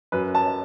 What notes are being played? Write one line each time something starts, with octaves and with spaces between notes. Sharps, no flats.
F#2 B4
A5